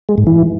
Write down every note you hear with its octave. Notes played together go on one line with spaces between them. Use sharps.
G#3
G#2
E3